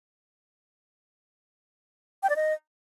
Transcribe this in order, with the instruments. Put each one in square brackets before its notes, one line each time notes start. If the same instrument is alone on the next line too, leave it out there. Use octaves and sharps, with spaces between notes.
[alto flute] G5
D5
D#5